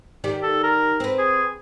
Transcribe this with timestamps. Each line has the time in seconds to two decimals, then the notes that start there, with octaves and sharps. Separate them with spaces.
0.24 D#3 G4 D5
0.43 A4
0.63 A#4
1.00 C4 B4
1.18 G#4